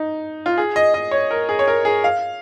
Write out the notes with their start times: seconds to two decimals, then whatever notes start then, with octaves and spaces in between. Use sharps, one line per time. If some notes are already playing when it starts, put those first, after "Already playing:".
Already playing: D#4
0.46 F4
0.58 G#4
0.76 D#5
0.94 D#5
1.11 C#5
1.31 A#4
1.49 G#4
1.59 C#5
1.68 A#4
1.85 G#4
2.04 F5